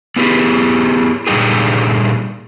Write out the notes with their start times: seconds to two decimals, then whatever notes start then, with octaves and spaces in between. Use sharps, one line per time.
0.16 B3 E4 G4 G#4
1.27 A#2 D3 G3 D#4 G4 G#4